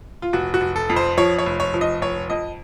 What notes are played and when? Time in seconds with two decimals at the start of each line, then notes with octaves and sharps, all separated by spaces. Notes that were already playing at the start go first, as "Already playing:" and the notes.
0.22 F4
0.33 F1 F#4
0.54 F#4
0.61 F1
0.76 A4
0.90 F2
0.96 C5
1.17 F3 C#5
1.39 C#5
1.46 F1
1.60 C#5
1.74 F3
1.81 D#5
2.02 F1 C#5
2.30 F2 D#5